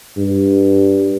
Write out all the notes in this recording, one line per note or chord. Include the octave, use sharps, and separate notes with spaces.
G2